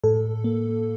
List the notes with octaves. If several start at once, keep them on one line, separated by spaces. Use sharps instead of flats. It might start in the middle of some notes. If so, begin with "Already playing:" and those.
A2 A4
A#3